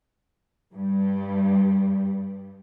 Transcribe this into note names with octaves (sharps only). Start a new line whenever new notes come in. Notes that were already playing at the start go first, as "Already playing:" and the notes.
G2 G3